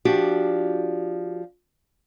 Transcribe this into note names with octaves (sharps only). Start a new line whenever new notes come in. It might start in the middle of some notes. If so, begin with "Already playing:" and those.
F3 D4 F#4 G4